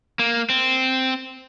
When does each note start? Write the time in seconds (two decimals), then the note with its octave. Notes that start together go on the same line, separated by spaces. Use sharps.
0.19 A#3
0.50 C4